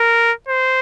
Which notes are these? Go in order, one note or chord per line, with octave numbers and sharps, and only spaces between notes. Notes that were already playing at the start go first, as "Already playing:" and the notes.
Already playing: A#4
C5